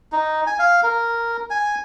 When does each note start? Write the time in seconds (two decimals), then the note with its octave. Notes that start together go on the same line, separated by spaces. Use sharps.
0.12 D#4
0.47 G#5
0.59 F5
0.83 A#4
1.50 G#5